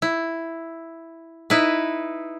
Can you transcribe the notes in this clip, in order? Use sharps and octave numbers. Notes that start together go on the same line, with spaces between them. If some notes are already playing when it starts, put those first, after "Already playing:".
E4
D#4 E4 B4